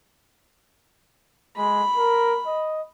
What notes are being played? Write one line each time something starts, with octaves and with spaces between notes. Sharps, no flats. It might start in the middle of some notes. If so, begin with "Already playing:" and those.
G#3 B5
A#4
D#5